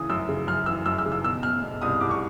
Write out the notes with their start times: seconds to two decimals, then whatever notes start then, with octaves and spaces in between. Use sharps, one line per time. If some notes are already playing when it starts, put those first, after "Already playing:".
Already playing: C#3 E3 D#6
0.09 F#2 E6
0.29 C#3
0.47 F#2 F6
0.66 E3 E6
0.86 F#2 E6
0.99 E6
1.05 C#3
1.12 E6
1.24 B2 E6
1.43 B2 F6
1.63 B2
1.82 C2 D#6
2.01 C2 D6
2.11 C#6